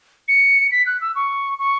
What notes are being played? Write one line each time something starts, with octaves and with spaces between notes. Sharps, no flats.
C#7
B6
F#6
E6
C#6
C#6